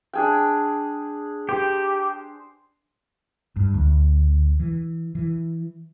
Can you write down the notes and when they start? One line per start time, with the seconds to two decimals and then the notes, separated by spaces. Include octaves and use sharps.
0.13 D4 G#4 G5
1.49 G4 C5
3.56 G2
3.74 D2
4.60 E3
5.15 E3